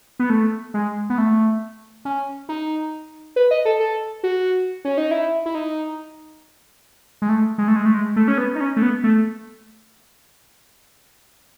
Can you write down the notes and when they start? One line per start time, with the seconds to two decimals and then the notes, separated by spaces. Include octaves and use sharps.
0.19 B3
0.30 A3
0.74 G#3
1.10 B3
1.18 A3
2.05 C#4
2.49 D#4
3.36 B4
3.51 D#5
3.65 A4
3.80 A4
4.23 F#4
4.85 C#4
4.98 D#4
5.11 E4
5.46 E4
5.55 D#4
7.22 G#3
7.29 A3
7.58 G#3
7.68 A3
7.76 G#3
7.86 A3
7.94 G#3
8.16 A3
8.28 C#4
8.38 B3
8.55 D#4
8.61 C#4
8.77 A3
8.82 B3
9.04 A3